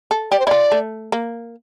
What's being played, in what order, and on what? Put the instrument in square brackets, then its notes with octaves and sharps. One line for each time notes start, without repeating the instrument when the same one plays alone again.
[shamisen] A4
[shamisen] G4 [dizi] D5
[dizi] C5
[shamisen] E4 [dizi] D5
[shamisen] F4
A3
A#3